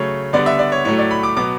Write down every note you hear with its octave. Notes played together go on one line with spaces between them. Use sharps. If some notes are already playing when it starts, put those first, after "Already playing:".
Already playing: C#3 F#3 A3 C#5
D3 G3 B3 D5
E5
D5
C#5
A2 F#3 A3 C#5
D5
B5
D6
B2 F#3 B3 D6